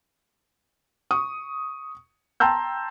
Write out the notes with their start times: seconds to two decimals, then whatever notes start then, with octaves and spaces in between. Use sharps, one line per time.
1.11 C#6 D#6
2.40 G5 A5 A#5 C6 E6 G6